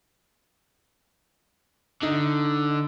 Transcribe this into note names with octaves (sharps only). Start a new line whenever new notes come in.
D3 D#4